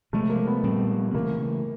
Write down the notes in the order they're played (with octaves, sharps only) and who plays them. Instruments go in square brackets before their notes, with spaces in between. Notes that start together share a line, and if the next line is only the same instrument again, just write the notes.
[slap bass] C3 F3 G#3 [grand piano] A3
[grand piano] A#3
B3
[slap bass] A#2 G3 C4
[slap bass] C#3 E3 A3 [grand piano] A#3